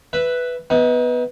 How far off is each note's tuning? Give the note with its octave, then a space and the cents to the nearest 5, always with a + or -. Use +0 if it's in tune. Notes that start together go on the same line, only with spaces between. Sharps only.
B4 +0 E5 +0
B3 -5 D#4 +35